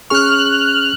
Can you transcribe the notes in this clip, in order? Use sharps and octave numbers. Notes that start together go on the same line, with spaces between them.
C#4 G#4 C#6 F6 F#6